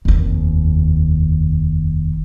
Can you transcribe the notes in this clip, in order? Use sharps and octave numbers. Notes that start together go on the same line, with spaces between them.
F1 D#2